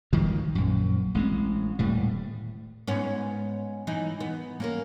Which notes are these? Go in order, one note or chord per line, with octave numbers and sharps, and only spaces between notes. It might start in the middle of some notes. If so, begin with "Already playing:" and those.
G1 D#3 F3 G#3
A#1 F#2
A1 G#3 C4
D#1 A2 G3
G#2 B3 C#4
E3 D#4
B3
A#3 C#4 A#4